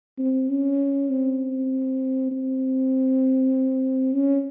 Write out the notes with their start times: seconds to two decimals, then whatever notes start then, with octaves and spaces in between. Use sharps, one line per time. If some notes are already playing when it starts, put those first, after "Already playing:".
0.18 C4
0.49 C#4
1.10 C4
2.31 C4
4.14 C#4